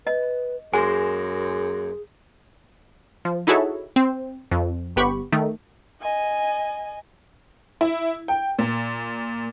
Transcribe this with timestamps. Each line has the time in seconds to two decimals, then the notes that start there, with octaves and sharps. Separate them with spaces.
0.07 B4 D#5
0.73 F#2 G#3 A#3 G#4 C5 G#5
3.25 F3
3.47 D#4 E4 F#4 G#4 A4 C#5
3.96 C4
4.51 F2
4.96 G1 B3 G4 B5 C#6
5.32 D#3 A3 D#4
6.01 D#5 G#5
7.81 E4
8.28 G5
8.59 A#2